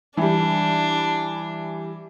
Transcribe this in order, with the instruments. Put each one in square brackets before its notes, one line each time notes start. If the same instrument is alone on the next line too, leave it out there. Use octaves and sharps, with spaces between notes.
[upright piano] E3 G3 [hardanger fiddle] D4